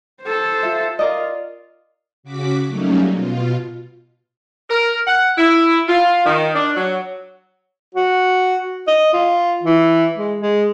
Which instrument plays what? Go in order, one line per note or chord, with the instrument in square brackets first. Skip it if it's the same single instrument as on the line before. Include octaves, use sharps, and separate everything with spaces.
[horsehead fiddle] A4 C5
[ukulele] F4 E5
[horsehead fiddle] F4 [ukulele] A#4 D5 D#5
[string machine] C#3 F#4 D6 B6
F#3 G3 A3 A#3 C#4 D#4
B2 F4
[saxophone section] A#4
F#5
E4
F4
D#3
D4
F#3
[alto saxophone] F#4
D#5
F4
E3
G#3
G#3